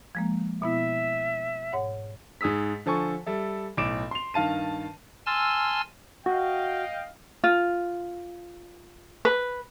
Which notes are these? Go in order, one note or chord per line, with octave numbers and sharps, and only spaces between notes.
F3 G#3 A#3
B2 B3 E4 E5
G#2 C#5 F#5
G#2 G#4 D#6 E6 B6
D3 F3 A4 G#5 C#6
G3 A4 E5
B1 A2 D6 D7 E7
C6 F7
G2 D#3 F5 A5 D#7
G#5 A5 C6 E6 F6 A6
F#4 D#5 F5 G5
F4
B4